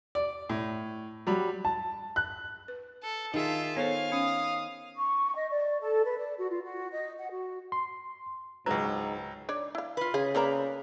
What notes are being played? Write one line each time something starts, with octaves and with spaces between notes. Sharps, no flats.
D5
A2
F#3 G3 B5
A5
F#6
B4
A4
D#3 F4 G#4 E5 A5
B3 A4 C5 C#5 F5 G#5
C#4 D#6
C#6
D#5
D5
A4
B4
D5
F#4
F4
F#4
D#5
F#5
F#4
C6
C#2 G#2 F#3 D4 B4 A#5
D4 C#5 D5
E4 F5
F4 B4
C#3 G#4 F5
A#3 C4 A#4 B4 D5 A#5